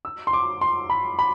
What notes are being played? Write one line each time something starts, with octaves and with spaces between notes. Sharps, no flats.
E6
C6
D6
C6
B5
B5